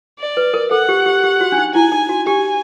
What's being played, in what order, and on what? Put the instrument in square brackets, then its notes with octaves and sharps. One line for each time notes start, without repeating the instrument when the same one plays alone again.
[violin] D5
[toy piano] B4
A#4
[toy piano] A4 [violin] F#5
[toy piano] G4
G4
G4
F#4
D4
D#4
[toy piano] E4 [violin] G#5
[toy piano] D#4
F#4
[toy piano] G4 [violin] G#5